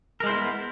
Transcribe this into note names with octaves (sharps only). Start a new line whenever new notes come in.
G#3 B3 E4 A#4 C5